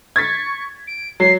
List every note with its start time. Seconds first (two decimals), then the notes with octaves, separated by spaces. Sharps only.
0.16 C#6 G#6 A6 B6
0.87 D7
1.20 F#3 C7